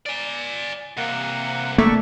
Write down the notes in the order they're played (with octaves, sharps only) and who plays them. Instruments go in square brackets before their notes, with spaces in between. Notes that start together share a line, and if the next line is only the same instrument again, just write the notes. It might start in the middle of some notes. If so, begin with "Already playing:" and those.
[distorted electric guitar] D5 G#5
[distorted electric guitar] C3 E3 [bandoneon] A#3 F#5
[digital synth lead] A3 [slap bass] A#3 [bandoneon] D5 E5 C#6